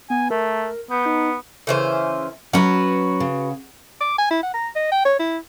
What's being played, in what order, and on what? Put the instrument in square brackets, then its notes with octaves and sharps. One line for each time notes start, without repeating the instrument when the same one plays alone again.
[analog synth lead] B3 [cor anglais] G#5
[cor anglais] A3 [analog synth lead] A#4
[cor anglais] B3 [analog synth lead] G6
[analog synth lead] D#4
[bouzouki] C#3 E3 C5
[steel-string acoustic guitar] F#3 C#4 [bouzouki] F#4 B4
[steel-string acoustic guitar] C#3
[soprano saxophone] D6
G#5
E4
F#5
A#5
D#5
G5
C#5
E4